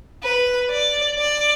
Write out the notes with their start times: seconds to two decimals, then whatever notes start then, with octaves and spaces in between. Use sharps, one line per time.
0.23 B4
0.71 D5
1.18 D5